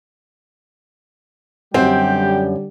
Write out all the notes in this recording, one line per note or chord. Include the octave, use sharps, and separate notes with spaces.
F#2 D3 G3 C4 G4